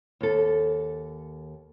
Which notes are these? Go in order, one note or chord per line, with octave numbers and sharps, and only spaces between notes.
D#2 A4